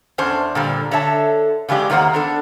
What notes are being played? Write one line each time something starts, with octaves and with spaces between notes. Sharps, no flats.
E2 C#4 D4 C5 A5
A#2 D3 G3
D3 C#5 E5 A5
C#3 E3 G#3 G4 D5
E2 D#3 A#3 C5 F#5
B3 D4 A4